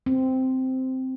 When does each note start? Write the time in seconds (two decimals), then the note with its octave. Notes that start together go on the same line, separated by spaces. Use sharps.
0.06 C4